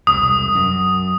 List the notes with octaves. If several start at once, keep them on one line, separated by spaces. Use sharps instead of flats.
E1 C2 D#6
F#2